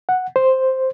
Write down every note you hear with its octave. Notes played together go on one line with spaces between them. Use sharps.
F#5
C5